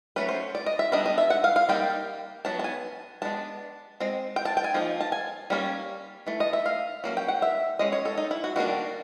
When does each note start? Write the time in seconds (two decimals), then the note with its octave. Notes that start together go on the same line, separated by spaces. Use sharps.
0.16 F#3 A3 C#4 B4
0.29 C5
0.55 D5
0.66 D#5
0.79 E5
0.92 G3 B3 D4 D#5
1.06 D#5
1.18 E5
1.30 F#5
1.44 F5
1.56 F5
1.69 G3 A#3 D#4 G5
2.45 F#3 B3 A5
2.59 A5
2.64 G#5
3.22 G#3 B3 D4 A5
4.00 G#3 C4
4.36 G5
4.45 A5
4.57 G5
4.64 G#5
4.74 F3 A#3 D#4
5.01 A5
5.12 G#5
5.50 G3 A#3 C#4
6.27 E3 A3
6.40 D#5
6.53 E5
6.66 F5
7.04 F#3 A#3 C#4
7.17 G5
7.28 F#5
7.42 E5
7.79 G#3 C#4 D#5
7.92 C#5
8.05 A4
8.18 D#4
8.31 E4
8.44 F#4
8.56 D#3 G3 A#3 D4 F#4